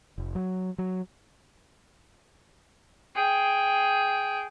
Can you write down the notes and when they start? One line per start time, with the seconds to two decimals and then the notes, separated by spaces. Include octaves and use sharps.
0.18 F1
0.35 F#3
0.78 F#3
3.15 G#4 G5